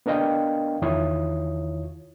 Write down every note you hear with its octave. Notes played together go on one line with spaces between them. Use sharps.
B3 D4 A#4 D#5 F5 G5
E2 D#3 E4 F4 C#5 D#6